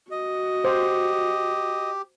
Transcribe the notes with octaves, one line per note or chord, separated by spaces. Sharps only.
F#4 D#5
G4 C5